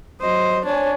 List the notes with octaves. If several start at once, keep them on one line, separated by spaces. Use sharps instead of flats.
F#3 C5 D#5
D4 C#5 G#5